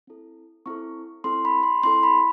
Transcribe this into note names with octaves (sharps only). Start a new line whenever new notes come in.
C4 E4 A4
C4 E4 A4 C#6
C4 E4 A4 C6
B5
C6
C4 E4 A4 C6
B5